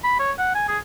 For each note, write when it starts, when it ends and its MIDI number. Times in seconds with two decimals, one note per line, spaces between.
0.04 0.17 83
0.19 0.32 73
0.38 0.53 78
0.55 0.66 80
0.68 0.78 68